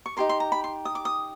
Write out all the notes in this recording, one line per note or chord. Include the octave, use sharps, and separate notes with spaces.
C#6
D#4 G4 A#4 C6
C6
A#5
B5
C6
D#6
D6
D#6